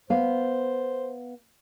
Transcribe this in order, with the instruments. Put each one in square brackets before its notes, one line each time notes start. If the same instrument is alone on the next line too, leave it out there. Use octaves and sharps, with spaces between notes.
[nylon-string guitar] B3 F5 [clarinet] C5